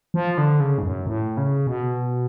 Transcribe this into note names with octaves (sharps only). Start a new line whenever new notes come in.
F3
D3
C#3
G#2
F#2
A2
C#3
B2